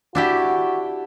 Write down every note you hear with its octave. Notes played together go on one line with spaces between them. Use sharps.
D4 E4 F#4 G4